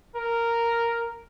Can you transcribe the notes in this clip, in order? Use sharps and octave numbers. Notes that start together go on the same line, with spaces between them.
A#4